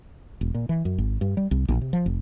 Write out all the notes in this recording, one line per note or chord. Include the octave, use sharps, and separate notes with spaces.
E1
A#2
E3
F#2
G#1
G2
G3
C2
A#1
C3
F3
F1